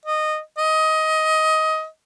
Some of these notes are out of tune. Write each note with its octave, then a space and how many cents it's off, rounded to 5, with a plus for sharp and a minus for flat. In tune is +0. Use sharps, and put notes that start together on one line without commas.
D#5 -15
D#5 +20